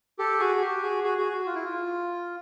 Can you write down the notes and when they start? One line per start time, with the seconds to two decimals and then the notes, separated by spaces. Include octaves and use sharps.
0.19 G4 A4
0.40 F#4 G#4
0.56 G#4
0.62 G4
0.82 F#4 G#4
1.04 F#4 G#4
1.18 F#4 G#4
1.32 F#4
1.46 F4
1.55 E4
1.64 F4